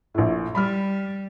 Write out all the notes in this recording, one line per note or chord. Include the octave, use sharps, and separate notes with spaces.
A#1 A2
G3 B5 F6